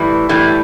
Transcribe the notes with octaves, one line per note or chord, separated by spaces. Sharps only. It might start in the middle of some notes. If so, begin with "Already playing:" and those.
Already playing: A2 E3 G3
A2 E3 G3